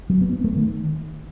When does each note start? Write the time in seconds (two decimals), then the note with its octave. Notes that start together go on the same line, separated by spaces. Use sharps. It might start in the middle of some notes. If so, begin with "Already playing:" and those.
0.10 F#3
0.21 B3
0.33 B3
0.44 A3
0.56 D#3